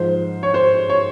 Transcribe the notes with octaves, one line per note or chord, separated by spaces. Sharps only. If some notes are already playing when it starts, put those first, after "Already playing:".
Already playing: G#2 F3 C5
C#5
C5
C#5